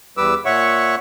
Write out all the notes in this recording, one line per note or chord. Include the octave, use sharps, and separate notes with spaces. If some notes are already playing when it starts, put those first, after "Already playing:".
E2 G3 B4 D6 E6
A#2 C#5 E5 F#5 C#6